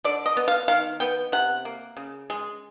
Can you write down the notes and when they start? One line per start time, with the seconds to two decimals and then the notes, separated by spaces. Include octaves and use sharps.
0.04 D3 D5
0.26 D#5
0.37 B3
0.48 F5
0.68 D#3 F5
1.00 B3 G5
1.32 C3 F#5
1.65 A#3
1.97 C#3
2.30 G#3